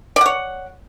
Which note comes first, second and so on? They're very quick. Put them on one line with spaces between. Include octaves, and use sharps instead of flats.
D5 F#5 C#5